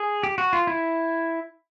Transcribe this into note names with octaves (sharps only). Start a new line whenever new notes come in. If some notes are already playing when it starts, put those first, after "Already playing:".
Already playing: G#4
G4
F#4
F4
E4